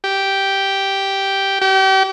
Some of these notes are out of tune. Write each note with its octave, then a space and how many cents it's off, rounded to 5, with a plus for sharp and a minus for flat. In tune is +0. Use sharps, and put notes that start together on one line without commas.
G4 -5
G4 -35